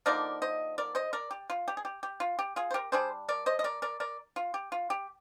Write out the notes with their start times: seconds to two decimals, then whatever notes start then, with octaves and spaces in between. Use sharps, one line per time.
0.06 D3 F3 A#3 D#4 A#4 D5
0.42 C5 D#5
0.78 A#4 D5
0.95 C5 D#5
1.13 A#4 D5
1.31 G4
1.50 F4
1.68 G4
1.77 G#4
1.85 G4
2.03 G4
2.20 F4
2.39 G4
2.56 F4 G#4
2.71 C5
2.74 G4 A#4
2.92 G3 D4 G#4 C5
3.29 A#4 D5
3.46 C5 D#5
3.59 D#5
3.64 A#4 D5
3.82 A#4 D5
4.00 A#4 D5
4.36 F4
4.54 G4
4.72 F4
4.90 G4